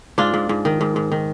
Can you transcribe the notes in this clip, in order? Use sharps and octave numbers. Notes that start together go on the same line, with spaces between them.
G#2 D4 F4
G#2
G#2
D#3
G#2
G#2
D#3